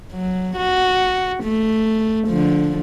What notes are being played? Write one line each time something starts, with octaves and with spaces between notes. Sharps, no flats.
F#3
F#4
A3
D3 F3